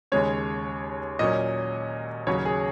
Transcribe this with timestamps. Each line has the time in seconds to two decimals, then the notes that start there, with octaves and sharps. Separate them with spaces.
0.12 D#2 C#3 G#3 C#4 C#5
1.19 A#2 F#3 C#4 D#5
2.27 D#2 C#3 F#3 C#4 C#5
2.45 G#4